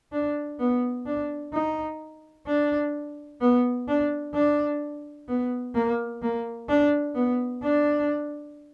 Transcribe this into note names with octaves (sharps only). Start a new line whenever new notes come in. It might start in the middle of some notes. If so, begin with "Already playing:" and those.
D4
B3
D4
D#4
D4
B3
D4
D4
B3
A#3
A#3
D4
B3
D4